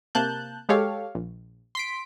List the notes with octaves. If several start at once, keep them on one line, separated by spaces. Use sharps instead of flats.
C3 A#3 A5 F#6 G6
G#3 G4 A4 C#5 F5
A#1
C6 B6 D7